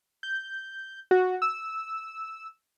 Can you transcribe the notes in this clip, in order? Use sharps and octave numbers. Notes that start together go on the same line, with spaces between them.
G6
F#4
E6